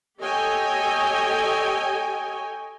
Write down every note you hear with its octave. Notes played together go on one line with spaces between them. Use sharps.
G4 A4 C#5 D#5 G5 G#5